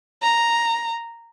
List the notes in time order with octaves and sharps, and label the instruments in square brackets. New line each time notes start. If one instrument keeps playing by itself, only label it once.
[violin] A#5